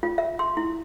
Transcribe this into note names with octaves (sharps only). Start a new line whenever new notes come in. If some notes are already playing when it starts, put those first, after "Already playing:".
F4
E5
C6
E4